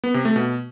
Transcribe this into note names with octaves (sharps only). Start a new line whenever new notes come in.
B3
C3
A3
B2